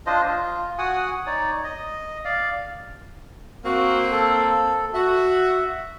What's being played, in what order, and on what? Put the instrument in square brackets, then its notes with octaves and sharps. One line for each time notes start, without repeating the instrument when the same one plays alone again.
[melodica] D4 F4 C5 D#5
F4
F#4 F#5 G#5 D#6
D#4 C#5 D5
D#5
D5 F5
[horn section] A#3 C4 [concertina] F#4
[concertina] A4
[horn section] F#4 [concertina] E5